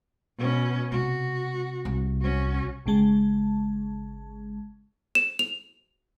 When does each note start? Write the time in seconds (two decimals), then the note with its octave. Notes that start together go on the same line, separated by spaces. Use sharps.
0.38 B2 C#4
0.92 C3 F#4
1.85 C2
2.21 C#4 F#4
2.86 G#1 C#3 G#3 A5
5.15 E7
5.39 F7